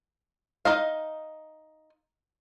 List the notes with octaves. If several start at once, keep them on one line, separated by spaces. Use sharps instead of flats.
D#4 D#5 F5